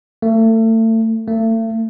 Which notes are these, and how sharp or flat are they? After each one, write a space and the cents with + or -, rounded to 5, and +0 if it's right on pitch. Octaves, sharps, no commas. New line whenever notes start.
A3 +35
A3 +40